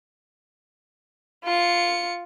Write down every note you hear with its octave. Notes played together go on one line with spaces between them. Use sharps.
F4 C#7